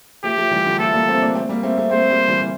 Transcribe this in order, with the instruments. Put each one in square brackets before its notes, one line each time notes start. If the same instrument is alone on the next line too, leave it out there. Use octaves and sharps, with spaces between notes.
[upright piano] F3 A3 [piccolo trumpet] G4
[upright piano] F3 A3
E3 G3
D3 F3
[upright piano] F3 A3 [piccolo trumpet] A4
[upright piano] G3 A#3
A3 C4
A#3 D4
A3 C4
G3 A#3
A3 C4
A3 C4
[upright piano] A3 C4 [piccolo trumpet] C5
[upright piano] G3 A#3
E3 G3
E3